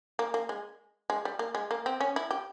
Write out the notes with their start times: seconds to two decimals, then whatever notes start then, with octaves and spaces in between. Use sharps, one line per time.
0.19 A#3
0.34 A#3
0.49 G#3
1.10 G#3
1.25 G3
1.39 A#3
1.55 G#3
1.71 A#3
1.86 C4
2.00 C#4
2.16 E4
2.31 G4